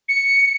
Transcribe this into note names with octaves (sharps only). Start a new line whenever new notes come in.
C#7